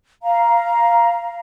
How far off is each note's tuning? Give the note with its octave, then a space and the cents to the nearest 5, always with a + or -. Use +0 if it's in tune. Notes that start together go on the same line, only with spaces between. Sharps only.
F5 -10 A#5 +10